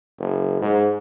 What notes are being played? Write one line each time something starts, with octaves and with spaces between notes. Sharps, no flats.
F#1
G#2